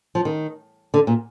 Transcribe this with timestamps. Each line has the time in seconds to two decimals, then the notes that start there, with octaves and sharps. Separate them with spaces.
0.15 F3
0.25 D#3
0.94 D3
1.07 A#2